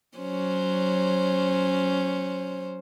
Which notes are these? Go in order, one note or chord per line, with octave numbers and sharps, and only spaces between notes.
F#3 C#4 C5